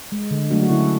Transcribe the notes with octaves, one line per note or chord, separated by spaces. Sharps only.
G#3
D3
F#3 A3 D4 F#4
F#4
D3 C#4 E4